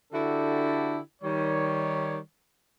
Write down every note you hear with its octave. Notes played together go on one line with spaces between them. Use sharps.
D3 D4 E4 F#4 G4 A4
D#3 G3 C#5